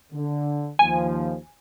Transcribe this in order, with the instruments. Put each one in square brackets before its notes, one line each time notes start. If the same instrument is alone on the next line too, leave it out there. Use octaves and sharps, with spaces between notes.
[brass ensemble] D3
[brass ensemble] D#2 F3 [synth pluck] G#5